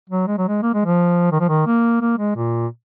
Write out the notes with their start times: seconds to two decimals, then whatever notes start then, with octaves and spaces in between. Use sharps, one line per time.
0.10 F#3
0.27 G#3
0.38 F#3
0.48 G#3
0.62 A#3
0.74 G#3
0.85 F3
1.32 D#3
1.40 F3
1.49 D#3
1.66 A#3
2.01 A#3
2.18 G#3
2.36 A#2